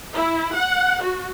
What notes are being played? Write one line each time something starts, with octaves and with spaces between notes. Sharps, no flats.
E4
F#5
F#4